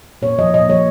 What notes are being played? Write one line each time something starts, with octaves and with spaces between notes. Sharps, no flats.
A#2 C#5
F3 A#3 D#5
A#2 D#5
F3 A#3 C#5